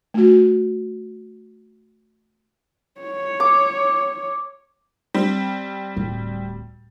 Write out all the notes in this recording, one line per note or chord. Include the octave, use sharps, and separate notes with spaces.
A3 F#4
C#5
D6
G3 C4
D1